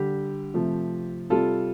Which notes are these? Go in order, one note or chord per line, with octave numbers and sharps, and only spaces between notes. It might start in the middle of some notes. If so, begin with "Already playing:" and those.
Already playing: D3 G3 G4
C3 F3 A3
C3 G3 F4 A4